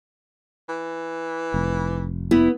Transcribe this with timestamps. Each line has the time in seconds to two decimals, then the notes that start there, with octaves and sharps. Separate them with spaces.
0.69 E3
1.54 F1
2.31 B3 E4